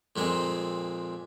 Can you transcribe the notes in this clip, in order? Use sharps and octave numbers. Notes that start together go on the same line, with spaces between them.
F2 A#2 G#3 C4